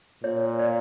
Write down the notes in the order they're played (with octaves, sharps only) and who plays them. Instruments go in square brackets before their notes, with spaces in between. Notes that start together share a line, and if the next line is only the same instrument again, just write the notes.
[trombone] A#2 [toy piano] C#5
[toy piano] D5